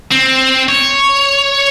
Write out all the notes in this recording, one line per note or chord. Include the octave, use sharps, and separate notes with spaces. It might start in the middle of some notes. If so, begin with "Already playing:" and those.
C4
C#5